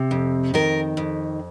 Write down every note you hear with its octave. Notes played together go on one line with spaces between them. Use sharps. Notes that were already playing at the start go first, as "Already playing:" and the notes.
Already playing: C3
F2
D#3 A#4
F2